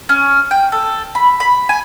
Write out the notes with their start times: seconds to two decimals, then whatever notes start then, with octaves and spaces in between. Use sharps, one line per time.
0.09 C#4
0.51 G5
0.72 A4
1.15 B5
1.40 B5
1.69 G#5